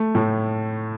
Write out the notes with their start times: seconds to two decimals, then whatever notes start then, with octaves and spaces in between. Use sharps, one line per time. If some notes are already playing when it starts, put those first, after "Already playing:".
Already playing: A3
0.15 A2